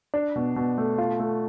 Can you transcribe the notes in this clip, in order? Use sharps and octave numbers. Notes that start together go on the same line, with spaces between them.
D4
B2
B2
A3
F4
A3